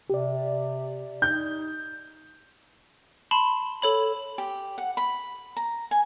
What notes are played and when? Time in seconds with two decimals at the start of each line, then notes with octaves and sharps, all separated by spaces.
0.10 C3 G4 D5
1.22 D#4 G6
3.31 A5 B5 C6
3.82 A4 C#5 B5
4.38 G4
4.78 F#5
4.97 B5
5.56 A#5
5.91 G#5